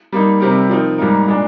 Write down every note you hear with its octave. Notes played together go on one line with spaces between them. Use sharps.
G3 A#3 D#4
C3 G3 C4 G4 A#4
F3 C4 D#4 A#4
G#2 G3 A#3 D#4 A#4
A#2 G#3 D4